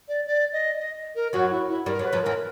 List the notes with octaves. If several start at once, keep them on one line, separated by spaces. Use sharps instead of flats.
D5
D5
D#5
D#5
A#4
F#2 F#3 F#4
E4
E4
G2 G3 A#4
F#2 F#3
B4
F2 F3
E2 E3 A#4